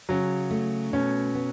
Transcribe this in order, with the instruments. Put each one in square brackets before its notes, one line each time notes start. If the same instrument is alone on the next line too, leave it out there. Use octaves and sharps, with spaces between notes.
[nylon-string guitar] C#3 [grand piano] F#3
[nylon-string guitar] A3
[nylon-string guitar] B2 [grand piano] C#4
[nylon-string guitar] B3